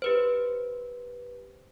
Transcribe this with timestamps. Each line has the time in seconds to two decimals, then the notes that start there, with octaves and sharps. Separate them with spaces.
0.02 G4 B4 C5